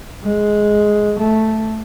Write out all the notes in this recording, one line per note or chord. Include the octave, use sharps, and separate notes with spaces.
G#3
A3